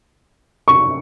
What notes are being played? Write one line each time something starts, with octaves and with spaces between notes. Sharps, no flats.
C#6